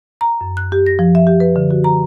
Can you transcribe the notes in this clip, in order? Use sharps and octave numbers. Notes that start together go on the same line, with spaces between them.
A#5
F#2
F#6
G4
A#6
F3
E5
G4
B4
D3
F#4
A#5